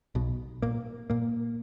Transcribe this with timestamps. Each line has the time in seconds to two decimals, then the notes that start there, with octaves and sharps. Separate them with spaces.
0.15 B1 B2
0.62 A#2 A#3
1.10 A#2 A#3